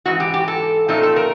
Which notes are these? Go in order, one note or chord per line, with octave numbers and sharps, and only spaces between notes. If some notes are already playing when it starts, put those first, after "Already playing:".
G#2 E3 F#4
G4
G4
A4
A#2 F3 A3 C4 D#4 A4
A4
A#4